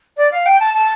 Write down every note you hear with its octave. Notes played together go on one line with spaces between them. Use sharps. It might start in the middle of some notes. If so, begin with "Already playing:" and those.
D5
F5
G5
A5
A5